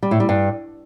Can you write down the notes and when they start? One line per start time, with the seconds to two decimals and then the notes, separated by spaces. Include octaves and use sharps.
0.03 G3
0.11 A2
0.20 G3
0.29 G2